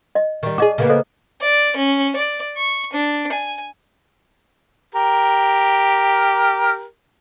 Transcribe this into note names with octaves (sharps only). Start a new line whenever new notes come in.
D#5
D#3 G3
F#4 G#4 D#5 D6
C#3 A#3 B3
A4 C5 D#5
D5
C#4
D5
C#6
D4
G#5
G4 A#4